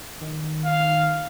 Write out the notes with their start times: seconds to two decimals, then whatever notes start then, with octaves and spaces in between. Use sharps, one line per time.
0.21 D#3
0.65 F5